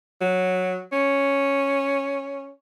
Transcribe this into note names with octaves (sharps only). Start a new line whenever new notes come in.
F#3
C#4